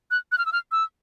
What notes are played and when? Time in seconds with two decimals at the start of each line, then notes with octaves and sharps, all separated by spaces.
0.11 F#6
0.32 F#6
0.38 F6
0.46 E6
0.53 F6
0.72 E6